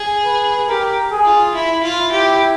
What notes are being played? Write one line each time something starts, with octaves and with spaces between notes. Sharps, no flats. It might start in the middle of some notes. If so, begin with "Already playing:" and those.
Already playing: G#4
B4
G4 A#4
G#4
F4
E4
F4
E4
G4